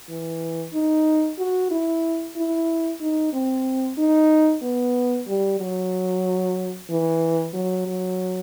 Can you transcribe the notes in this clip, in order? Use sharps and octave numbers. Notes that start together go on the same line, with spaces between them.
E3
D#4
F#4
E4
E4
D#4
C4
D#4
B3
G3
F#3
E3
F#3
F#3